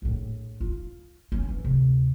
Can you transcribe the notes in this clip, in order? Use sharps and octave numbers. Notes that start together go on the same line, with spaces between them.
A#1 A2
F4
C#4
E3
D2 C3